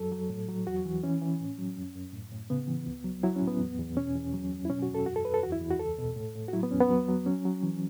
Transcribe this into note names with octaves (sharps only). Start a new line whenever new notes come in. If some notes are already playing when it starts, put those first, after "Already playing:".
Already playing: F#2 F#3 A4
F#3
A2
F#3
E2 F#4
E3
E3 C#4
E3
A2
F#3
F#2
F#2
A2
A2
C#3 B3
E3
C#2
F#3
F#3 E4
C#4
A2
B3
E2
E2
B2 C#4
E2
F#3
F#2
E4
B2 C#4
F#4
E2
A4
F#2 F#4
A4
F#2 B4
A4
E2 F#4
E4
E2
F#4
C#2 A4
B2
A2
A2
F#4
F#3 E4
B3
E2 C#4
B3
F#3
F#3
F#3 C#4
F#3
E3